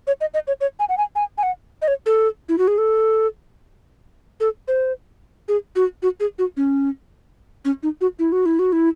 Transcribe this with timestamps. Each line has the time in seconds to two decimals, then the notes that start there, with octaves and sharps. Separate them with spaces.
0.07 C#5
0.21 D#5
0.34 D#5
0.47 C#5
0.61 C#5
0.80 G#5
0.89 F#5
0.98 G#5
1.16 G#5
1.38 G#5
1.43 F#5
1.82 D#5
1.88 C#5
2.06 A4
2.49 E4
2.58 F#4
2.68 G#4
2.78 A4
4.40 A4
4.68 C5
5.48 G#4
5.76 F#4
6.03 F#4
6.20 G#4
6.39 F#4
6.57 C#4
7.65 C#4
7.83 D#4
8.01 F#4
8.19 E4
8.32 F#4
8.46 E4
8.59 F#4
8.73 E4